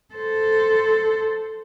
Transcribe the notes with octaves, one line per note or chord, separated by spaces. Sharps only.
A4 C5